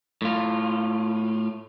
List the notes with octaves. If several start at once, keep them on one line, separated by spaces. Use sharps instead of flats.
A2 F4